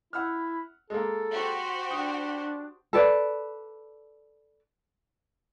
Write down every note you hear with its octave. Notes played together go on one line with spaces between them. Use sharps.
E4 F#5 E6 F6
G#3 A#3 A4
F#4 G4 C5
D4 G5 D#6
A4 B4 D5